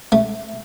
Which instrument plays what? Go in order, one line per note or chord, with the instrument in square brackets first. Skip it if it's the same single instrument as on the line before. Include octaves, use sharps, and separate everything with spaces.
[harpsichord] A3